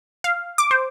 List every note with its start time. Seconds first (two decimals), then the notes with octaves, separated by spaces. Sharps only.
0.24 F5
0.58 D6
0.71 C5